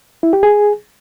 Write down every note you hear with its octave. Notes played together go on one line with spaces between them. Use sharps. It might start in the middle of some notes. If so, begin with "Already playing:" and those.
E4
G4
G#4